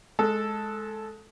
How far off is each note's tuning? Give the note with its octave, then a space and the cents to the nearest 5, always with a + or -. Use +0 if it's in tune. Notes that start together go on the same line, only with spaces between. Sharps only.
G#3 +20 A4 +0